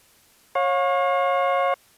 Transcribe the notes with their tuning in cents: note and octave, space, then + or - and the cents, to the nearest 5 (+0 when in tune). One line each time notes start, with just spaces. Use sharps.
C#5 -20 F5 +35